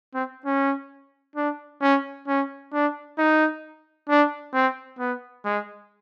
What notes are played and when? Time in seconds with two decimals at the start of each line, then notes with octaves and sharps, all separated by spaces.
0.14 C4
0.46 C#4
1.36 D4
1.82 C#4
2.27 C#4
2.73 D4
3.18 D#4
4.09 D4
4.54 C4
4.99 B3
5.45 G#3